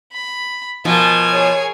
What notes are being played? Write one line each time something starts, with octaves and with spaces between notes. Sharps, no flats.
B5
B2 F3 A#4 G#5
G#4 C#5